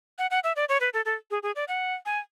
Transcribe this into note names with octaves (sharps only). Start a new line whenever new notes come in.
F#5
F#5
E5
D5
C#5
B4
A4
A4
G#4
G#4
D5
F#5
G#5